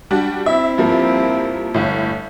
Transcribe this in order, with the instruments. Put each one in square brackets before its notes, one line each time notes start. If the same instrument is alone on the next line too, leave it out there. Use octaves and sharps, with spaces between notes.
[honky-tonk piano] G3 D4 F#4
[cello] C4 E4 [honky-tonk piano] E5
[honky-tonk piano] G2 F3 A#3
G1 A2